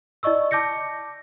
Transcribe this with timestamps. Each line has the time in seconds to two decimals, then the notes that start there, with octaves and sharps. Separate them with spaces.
0.23 E4 D5 D#5 C#6 E6
0.51 A5 D6 G6 A#6 C#7